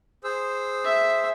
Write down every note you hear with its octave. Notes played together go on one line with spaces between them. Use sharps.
G#4 C5 E6
E5